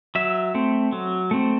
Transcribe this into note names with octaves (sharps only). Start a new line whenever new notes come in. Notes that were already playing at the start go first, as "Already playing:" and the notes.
F#3 E5
A3 C4
F#3
A3 C4